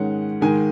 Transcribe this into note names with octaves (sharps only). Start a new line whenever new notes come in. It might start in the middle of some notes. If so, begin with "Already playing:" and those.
Already playing: G#2 D#3 G#3 C#4 F#5
G#2 D#3 G#3 G#5